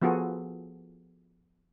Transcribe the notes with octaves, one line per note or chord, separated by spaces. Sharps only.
F3 B3 F4 F#4 G#4 A4